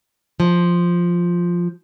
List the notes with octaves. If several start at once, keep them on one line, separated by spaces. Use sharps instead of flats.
F3